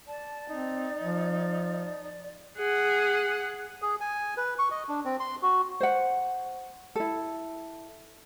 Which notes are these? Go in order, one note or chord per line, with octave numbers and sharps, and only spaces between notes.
D5 A5
C4 D#4
F3
G#4 F#5
G#4
G#5
B4
C#6
D#5
D4
C4
C6
F#4
C5 F#5
E4 A4